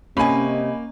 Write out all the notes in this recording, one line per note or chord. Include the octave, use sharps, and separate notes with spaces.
C3 A#3 C#4 D#5 G#5 B5